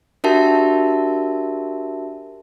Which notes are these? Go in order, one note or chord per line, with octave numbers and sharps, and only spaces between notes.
D4 F#4 G4 A#4 E5 A5